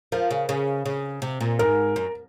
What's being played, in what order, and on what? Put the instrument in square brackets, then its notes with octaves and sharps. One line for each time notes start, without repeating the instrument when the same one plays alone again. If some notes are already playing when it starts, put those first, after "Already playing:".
[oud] F3 [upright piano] A#4
[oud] C#3
C#3
C#3
C3
A#2
[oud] G#2 [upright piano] A#4
[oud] F#2